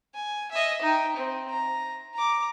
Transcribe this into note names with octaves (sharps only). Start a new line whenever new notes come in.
G#5
D#5 E5
D#4 G5
C4
A#5
A#5 D6